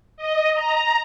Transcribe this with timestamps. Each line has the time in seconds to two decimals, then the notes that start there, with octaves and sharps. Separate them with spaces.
0.17 D#5
0.54 A#5